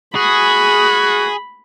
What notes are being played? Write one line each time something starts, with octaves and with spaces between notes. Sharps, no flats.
F#4 G#4 B5